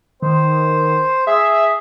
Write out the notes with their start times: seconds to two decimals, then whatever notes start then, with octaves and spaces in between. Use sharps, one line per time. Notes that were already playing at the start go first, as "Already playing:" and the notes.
0.22 D#3 C5
1.27 G#4 E5